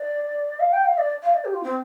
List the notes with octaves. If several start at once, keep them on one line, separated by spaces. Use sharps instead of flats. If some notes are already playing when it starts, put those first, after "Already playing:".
Already playing: D5
F5
G5
F5
D5
F5
D5
G4
F4
C4